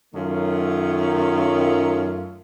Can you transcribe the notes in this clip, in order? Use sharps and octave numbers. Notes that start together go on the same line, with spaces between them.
F#2 D#3 F#3 A3 F4